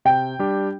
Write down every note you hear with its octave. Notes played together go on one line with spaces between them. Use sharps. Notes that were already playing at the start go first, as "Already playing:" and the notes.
C3 G5
G3 D4 G4